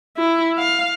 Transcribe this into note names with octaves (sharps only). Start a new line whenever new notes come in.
E4
F5